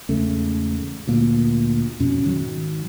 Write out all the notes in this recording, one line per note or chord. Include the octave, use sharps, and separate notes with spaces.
E2 G#2 C#3 A3
D2 A#2 A#3
F2 B2 C#4
G#2 D#3 F#3